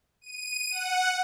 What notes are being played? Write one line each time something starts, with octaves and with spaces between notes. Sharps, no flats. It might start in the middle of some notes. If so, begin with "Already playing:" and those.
D#7
F#5